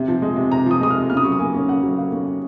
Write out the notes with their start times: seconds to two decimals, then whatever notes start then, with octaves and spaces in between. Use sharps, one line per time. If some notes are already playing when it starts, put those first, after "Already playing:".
Already playing: C3
0.08 F3
0.22 G#3
0.36 C3
0.52 C3 A#5
0.66 F3 D#6
0.81 G#3 D#6
0.90 F6
0.95 C3
1.10 C#3 F6
1.17 D#6
1.24 F#3 C#6
1.32 D#6
1.39 A#3 G#5
1.54 C#4
1.68 C#3 F#5
1.83 F#3
1.97 A#3 F5
2.12 C#4